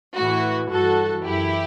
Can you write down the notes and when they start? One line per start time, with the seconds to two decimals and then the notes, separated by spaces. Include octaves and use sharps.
0.16 A2 E3 F#4
0.70 G2 E3 F#4 A4
1.24 F#2 E3 E4 G4